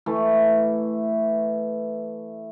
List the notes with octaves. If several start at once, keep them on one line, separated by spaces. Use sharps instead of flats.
E3 A3